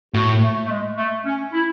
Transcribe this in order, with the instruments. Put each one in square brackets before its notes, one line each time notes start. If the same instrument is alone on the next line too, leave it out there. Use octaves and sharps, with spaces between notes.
[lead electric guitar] A2 [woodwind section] F#4
[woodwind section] A3
A3
G#3
A3
C#4
E4